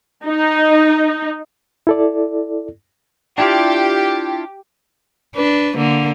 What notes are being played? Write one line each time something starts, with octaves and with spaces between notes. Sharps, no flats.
D#4
E4 A4 D5
D4 E4 F4 G4
D4 B4
D3 A#3